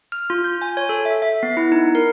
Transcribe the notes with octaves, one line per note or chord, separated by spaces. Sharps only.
F6
F4
G6
G#5
C#5
A4
E5
E5
B3
E4
D#4
A#4